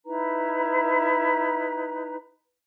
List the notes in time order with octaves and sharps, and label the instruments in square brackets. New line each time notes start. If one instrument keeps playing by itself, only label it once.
[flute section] D#4 E4 B4 A#5